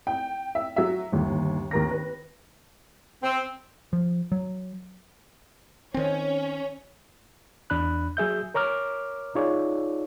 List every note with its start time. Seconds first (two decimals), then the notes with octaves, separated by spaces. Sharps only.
0.07 G5
0.55 E5
0.76 F#3 E5
1.12 G1 D#2
1.71 D#2 A#4 A#6
1.91 B4
3.23 C4
3.93 F3
4.32 F#3
5.94 D#3 C4 C#4
7.70 E2 D4 B5 F#6
8.17 F#3 G#4 E5 G6
8.54 A#4 C#5 A#5 D6 F6
9.35 D#4 F4 G#4 C#5 D5